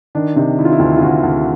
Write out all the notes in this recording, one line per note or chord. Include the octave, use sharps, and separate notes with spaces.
D#3 D4
C3 D#4
D#3 E4
F4
E4
D2 F4
F4
D2 F#4
D2